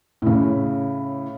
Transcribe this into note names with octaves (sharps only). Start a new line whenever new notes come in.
A2 C#3